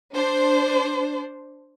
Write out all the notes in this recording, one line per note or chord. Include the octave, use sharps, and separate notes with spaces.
D4 C5